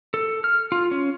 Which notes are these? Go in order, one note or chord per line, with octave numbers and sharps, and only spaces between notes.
A4
F6
F4
C#4